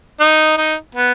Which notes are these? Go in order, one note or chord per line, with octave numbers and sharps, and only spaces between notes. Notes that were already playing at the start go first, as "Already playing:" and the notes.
D#4
D#4
B3